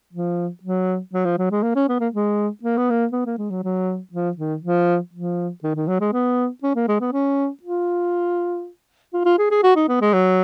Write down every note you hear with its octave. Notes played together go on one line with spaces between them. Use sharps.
F3
F#3
F#3
F3
F#3
G#3
A#3
C#4
B3
A#3
G#3
A#3
B3
A#3
B3
A#3
G#3
F#3
F#3
F3
D#3
F3
F3
D#3
D#3
F#3
G#3
B3
C#4
A#3
G#3
B3
C#4
F4
F4
F4
G#4
G#4
F#4
D#4
B3
G#3
F#3